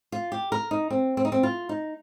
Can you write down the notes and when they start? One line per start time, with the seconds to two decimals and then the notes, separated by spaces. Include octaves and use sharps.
0.12 F4
0.32 G4
0.52 A#4
0.71 D#4
0.90 C4
1.17 C4
1.25 D#4
1.32 C4
1.43 F4
1.69 D#4